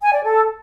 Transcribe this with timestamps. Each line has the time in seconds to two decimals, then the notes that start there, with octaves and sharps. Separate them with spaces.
0.02 G#5
0.13 D5
0.23 A4